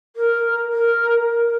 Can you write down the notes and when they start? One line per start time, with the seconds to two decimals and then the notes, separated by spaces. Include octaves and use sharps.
0.16 A#4
0.72 A#4
1.29 A#4